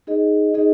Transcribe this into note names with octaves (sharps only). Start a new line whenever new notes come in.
D#4 G#4 D#5
D#4 G#4 D#5